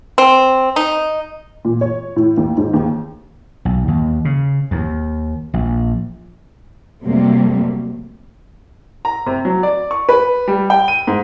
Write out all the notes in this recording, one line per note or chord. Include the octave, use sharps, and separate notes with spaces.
C4
D#4
A#2
C#5
A2
D#2
G#2
D#2
B1
D#2
C#3
D#2
A#1
F2 C3 F#3 G3 A3 A#3
A#5
C3
F#3
D5
C#6
B4
G3
G5
D#7
G#2